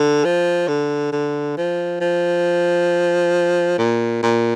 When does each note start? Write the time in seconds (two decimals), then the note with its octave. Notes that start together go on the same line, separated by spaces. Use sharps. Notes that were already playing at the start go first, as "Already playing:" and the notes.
Already playing: D3
0.25 F3
0.68 D3
1.12 D3
1.58 F3
2.01 F3
3.79 A#2
4.23 A#2